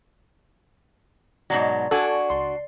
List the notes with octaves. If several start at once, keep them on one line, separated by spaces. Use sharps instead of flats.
G#2 B2 F#3 D5
D4 F#4 A4 G#5
C#2 C6 C7